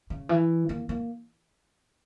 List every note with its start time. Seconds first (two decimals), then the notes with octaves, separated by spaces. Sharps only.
0.10 C#3
0.29 E3
0.69 A#3
0.89 A#3